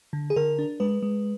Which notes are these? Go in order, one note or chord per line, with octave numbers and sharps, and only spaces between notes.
D3
G#4
D3 A#4
D4
G#3 B4
G#3